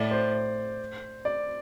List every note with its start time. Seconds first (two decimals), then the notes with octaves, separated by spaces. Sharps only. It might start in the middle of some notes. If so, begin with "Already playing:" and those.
Already playing: A2 D5
0.11 C5
1.25 D5